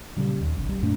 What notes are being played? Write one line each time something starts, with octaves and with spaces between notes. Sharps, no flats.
A#2 C#3 G3
D#2
F#1 B1 F#2
G3
F#2 A#2 A3 D4